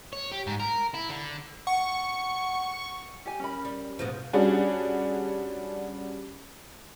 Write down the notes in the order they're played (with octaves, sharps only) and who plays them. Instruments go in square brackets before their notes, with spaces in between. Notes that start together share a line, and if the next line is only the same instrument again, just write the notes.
[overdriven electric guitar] C#5
G4
G#2
A#4
E4
D3
[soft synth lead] F#5 [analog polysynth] C#6
[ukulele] G4 G#5
C#4 A#4 B5
[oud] G3
G#2 B2 F3
[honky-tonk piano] G3 C#4 D4 F#4 G#4